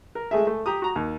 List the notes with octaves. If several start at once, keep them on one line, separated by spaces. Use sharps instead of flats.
A#4
G#3 A3 G#4 E5
A3
G4 A#5 D#6
F#4 A#5
D#2